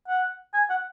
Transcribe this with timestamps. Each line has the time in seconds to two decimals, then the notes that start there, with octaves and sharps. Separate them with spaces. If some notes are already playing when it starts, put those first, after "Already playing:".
0.08 F#5
0.54 G#5
0.69 F#5